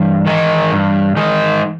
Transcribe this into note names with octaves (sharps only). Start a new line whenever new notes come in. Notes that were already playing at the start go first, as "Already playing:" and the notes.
Already playing: G2 E3
D#3 G#3 D#4
G2
D#3 G#3 D#4